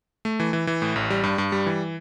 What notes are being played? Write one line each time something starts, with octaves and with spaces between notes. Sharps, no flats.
A3
E3
E3
E3
A2
A1
G3
G2
G2
G3
E3